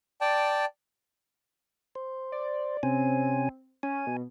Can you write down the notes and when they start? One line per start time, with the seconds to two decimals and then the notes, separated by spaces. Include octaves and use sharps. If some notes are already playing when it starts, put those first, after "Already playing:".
0.21 D5 G5 A5
1.95 C5
2.32 D5
2.83 C3 C4 C#4 G#5
3.83 C#4 G#5
4.07 B2